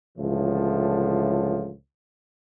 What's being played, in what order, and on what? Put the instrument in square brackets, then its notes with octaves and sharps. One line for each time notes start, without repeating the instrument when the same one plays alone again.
[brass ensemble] C#2 A2 D3 E3 F3